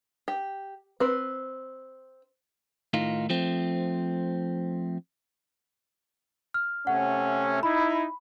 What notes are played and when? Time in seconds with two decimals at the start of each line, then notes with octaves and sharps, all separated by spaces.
0.28 G4
1.00 C4 B4
2.94 A2 D#3 D#4 F4
3.30 F3 A3 C4
6.54 F6
6.87 C3 A3 C#4 F#5
7.63 D#4 E4 B5